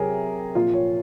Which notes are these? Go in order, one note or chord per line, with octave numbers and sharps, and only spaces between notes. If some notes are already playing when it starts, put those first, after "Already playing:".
Already playing: C3 F#3 G#4 A#4
A#2 F3 F4
C#5